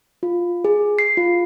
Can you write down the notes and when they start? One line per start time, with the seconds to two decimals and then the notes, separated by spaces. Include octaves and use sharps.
0.23 F4
0.65 G#4
0.99 C7
1.17 F4